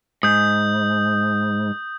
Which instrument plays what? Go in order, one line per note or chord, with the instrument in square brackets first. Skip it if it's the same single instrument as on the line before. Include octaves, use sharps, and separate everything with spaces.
[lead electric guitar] G#2 [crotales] D#6 G6